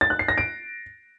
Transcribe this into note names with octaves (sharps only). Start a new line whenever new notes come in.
A6
F#6
C7
A#6
D7